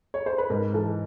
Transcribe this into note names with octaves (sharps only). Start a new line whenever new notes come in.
C#5
C5
B4
G#2 A#4
E3 A4